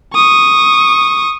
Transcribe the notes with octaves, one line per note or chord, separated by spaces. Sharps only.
C#6 D#6